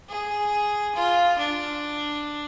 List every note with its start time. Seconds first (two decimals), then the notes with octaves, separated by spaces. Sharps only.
0.09 G#4
0.95 F4
1.38 D4